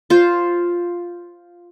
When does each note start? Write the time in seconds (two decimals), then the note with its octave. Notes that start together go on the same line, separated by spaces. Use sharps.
0.10 F4 C5